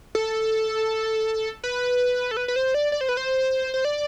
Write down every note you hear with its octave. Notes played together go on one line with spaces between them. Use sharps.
A4
B4
A4
B4
B4
C5
D5
D5
C5
B4
C5
C5
D5